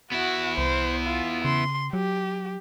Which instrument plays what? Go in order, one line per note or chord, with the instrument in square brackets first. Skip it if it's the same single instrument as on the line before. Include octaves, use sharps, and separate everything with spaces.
[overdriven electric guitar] B3 E4 [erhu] F#4
[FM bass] C2 [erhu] C5
[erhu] F4
[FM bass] C#3 [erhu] C6
[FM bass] F#3 [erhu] G4